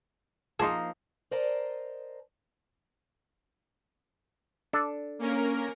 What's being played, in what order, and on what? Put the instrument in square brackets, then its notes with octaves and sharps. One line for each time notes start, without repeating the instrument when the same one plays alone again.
[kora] F3 A#3 D#4 [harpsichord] G#4 [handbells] A5 C6
[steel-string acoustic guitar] A#4 C5 D5 D#5 A5 A#5
[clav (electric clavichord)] D4 A4
[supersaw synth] A#3 C#4 A#4